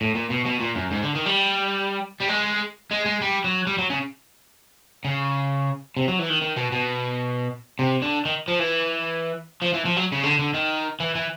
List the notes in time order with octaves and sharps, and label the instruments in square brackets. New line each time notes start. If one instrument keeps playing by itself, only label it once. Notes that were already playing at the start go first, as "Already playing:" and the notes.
[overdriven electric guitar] A2
A#2
B2
B2
A#2
F#2
G#2
D3
D#3
G3
G3
G#3
G#3
G#3
G3
F#3
G3
F#3
C#3
C#3
C3
F#3
E3
D#3
D#3
B2
B2
C3
D3
D#3
F3
E3
F3
E3
F3
F#3
C#3
D3
D3
D#3
E3
E3